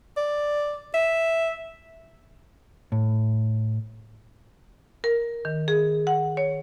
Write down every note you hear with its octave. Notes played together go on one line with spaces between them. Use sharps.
D5
E5
A2
A#4
D#3
G#4
F#5
C#5